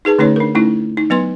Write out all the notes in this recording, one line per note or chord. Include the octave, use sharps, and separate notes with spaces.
D#4 G#4 B4 A5
D3 A3 C#4 D#4 B4 C#5
D4 A#4
A3 C#4 D#4 E4
D#4
F#3 B3 B4 C6